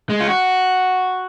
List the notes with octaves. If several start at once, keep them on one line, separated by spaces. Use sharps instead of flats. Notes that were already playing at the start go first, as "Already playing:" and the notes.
G#3
F4
F#4